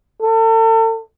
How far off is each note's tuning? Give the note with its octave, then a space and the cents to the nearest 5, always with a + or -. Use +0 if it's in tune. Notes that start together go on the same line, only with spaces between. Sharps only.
A4 +40